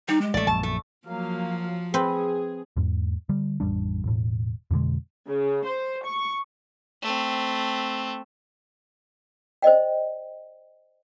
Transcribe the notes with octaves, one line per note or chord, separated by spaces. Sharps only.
G3 D#4
G#3
A1 A3 D5
A#1 F#2 A5
A3
F3 F#3 A#3 F5
C4 G#4 B4
E2 G#2
D3 G3
A1 F2 G3 D4
E1 A2
F2 B2 D3 G#3
C#3
C5
C#6
A3 C4
C5 D5 D#5 G5